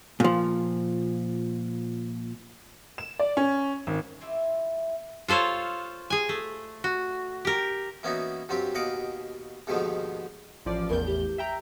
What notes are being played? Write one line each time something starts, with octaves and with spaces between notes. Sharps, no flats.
A#2 F3
E7
D5
C#4
G#1
E4 F4 G4 E5
F4 A4 C5 C#5 F5
G#4 G#5
A3
F#4
G4 A#4
E3 A#3 B3 C#4 D#4 F#4
G2 F#3 C4 F4 G4
D#2 B2 D#5 F5 F#5 D6
D#2 G#2 B2 D3 D#3 F3
A1 F3 D5
A1 E2 A#4 G6
G4
E5 G5 A#5